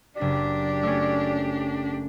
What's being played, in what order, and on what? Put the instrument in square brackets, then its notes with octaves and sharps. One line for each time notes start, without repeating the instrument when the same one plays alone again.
[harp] F#1 B6 [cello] D4 G4 [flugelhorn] D5
[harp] A3 C#4